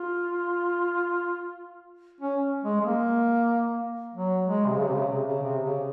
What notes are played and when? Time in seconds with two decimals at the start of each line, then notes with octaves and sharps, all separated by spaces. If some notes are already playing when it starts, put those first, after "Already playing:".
Already playing: F4
2.21 C#4
2.64 G#3
2.80 G#3
2.86 A#3
4.14 F#3
4.47 G#3
4.67 C3
4.78 C#3
4.88 C3
4.94 C#3
5.11 C3
5.27 C#3
5.43 C3
5.64 C#3